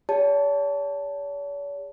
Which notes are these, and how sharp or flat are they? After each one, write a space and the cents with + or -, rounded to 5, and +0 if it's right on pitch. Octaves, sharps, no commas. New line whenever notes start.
G#4 -45 C#5 +45 A5 +0